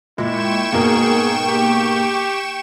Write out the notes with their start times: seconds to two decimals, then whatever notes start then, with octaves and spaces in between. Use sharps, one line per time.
0.18 A#2 G#3 E4 G5 C#6 E7
0.73 G#2 B2 A#3 G#4 A#4
1.49 G4